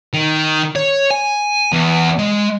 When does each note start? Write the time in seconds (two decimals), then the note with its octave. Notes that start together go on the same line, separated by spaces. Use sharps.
0.14 D#3
0.76 C#5
1.11 G#5
1.72 E2
2.19 G#3